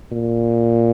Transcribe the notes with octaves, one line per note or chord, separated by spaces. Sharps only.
A#2